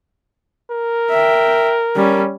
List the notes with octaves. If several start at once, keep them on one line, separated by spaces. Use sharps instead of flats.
A#4
E5 G5
G3 C#4